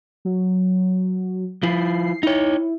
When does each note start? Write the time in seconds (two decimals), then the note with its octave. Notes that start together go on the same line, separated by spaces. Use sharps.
0.25 F#3
1.63 F3 E4 C7
2.23 D#4 E4 C#5